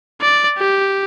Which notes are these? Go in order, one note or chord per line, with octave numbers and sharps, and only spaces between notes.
D5
G4